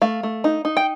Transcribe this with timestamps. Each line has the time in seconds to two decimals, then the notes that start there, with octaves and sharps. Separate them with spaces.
0.02 A3 F5
0.23 A3
0.44 D#4
0.65 D#4
0.77 G5